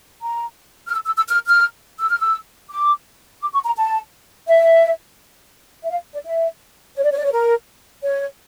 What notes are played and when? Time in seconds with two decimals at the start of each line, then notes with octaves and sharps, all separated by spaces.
0.23 A#5
0.88 F6
0.93 E6
1.06 E6
1.17 E6
1.29 F6
1.48 F6
2.00 E6
2.10 F6
2.20 E6
2.70 D6
3.41 D6
3.54 C#6
3.66 A#5
3.77 A5
4.48 E5
5.83 E5
5.90 F5
6.13 D5
6.26 E5
6.96 C#5
7.03 D5
7.11 C#5
7.18 D5
7.25 C#5
7.32 A#4
8.03 C#5